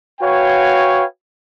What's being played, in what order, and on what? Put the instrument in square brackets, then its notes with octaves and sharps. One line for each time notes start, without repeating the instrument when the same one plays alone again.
[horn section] F#4 B4 C#5 F5 G5 G#5